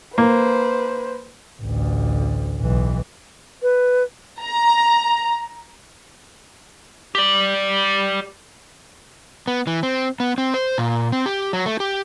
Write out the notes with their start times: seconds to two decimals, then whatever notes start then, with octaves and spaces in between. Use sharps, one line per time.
0.18 A#3 B4 C5
1.61 A1 D2
2.60 B1 E3
3.62 B4
4.42 A#5
7.15 G4 D5
9.48 B3
9.67 E3
9.83 C4
10.20 B3
10.38 C4
10.54 C5
10.78 A#2
11.12 C4
11.26 G4
11.53 F#3
11.66 A3
11.80 G4